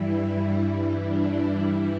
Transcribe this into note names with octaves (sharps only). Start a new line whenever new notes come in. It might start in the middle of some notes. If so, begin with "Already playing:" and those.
Already playing: G2 E3 G3 E4
E4
D4
G2 E3 G3 E4